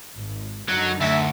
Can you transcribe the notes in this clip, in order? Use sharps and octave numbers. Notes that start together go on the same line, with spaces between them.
G#1
F#2 D3 F#3 D#4
D2 E5